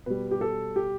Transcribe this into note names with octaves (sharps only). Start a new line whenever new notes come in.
B2 G3 B4
G4
A4
G4